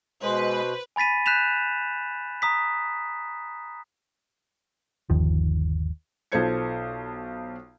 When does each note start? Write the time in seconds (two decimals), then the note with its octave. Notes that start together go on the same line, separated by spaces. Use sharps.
0.23 B2 G#3 B4 C5
0.96 G#5 B5 A6 B6 D#7
1.26 F#6 G6 B6 E7 F7
2.42 A#5 D#6 B6
5.10 G1 D#2 D#3 F3
6.32 B1 F4 A4 C5 G#6 C#7